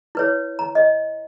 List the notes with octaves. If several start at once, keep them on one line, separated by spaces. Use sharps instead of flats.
E4 B4 C#5
A#5
D#5